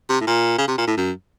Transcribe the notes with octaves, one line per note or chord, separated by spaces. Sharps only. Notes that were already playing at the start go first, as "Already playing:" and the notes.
C3
A2
A#2
C#3
C3
A#2
A2
F#2